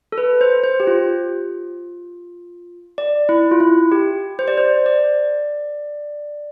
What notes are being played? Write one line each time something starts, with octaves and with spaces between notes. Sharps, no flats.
A4
B4
C5
C5
G4
F4
D5
E4
F4
E4
G4
C5
D5
C5
D5